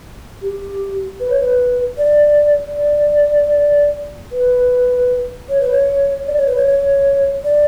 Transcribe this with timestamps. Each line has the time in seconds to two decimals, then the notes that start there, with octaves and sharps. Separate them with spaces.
0.42 G4
1.20 B4
1.30 C#5
1.40 B4
1.98 D5
2.76 D5
4.32 B4
5.49 C#5
5.61 B4
5.72 C#5
6.27 D5
6.37 C#5
6.47 B4
6.57 C#5
6.67 C#5
7.44 D5